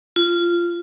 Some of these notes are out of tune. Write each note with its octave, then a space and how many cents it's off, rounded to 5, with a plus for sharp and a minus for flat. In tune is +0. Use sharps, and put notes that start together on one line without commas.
F4 -15